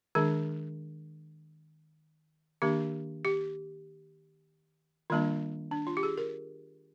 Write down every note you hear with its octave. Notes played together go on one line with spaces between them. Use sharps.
D#3 G#3 D4 G#4
D#3 A#3 D4 G4
G4
D#3 G3 A#3 D4 F4
D4
F4
G4
G#4
A#4